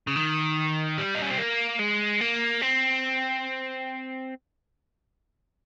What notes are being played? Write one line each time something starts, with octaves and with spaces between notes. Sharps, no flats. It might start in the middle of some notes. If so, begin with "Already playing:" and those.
C#3
D#3
G3
D#4
C#4
C4
A#3
G#3
A#3
C4